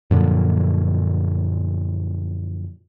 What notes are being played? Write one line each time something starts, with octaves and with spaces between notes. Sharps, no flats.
F#2 A#2 D3 F3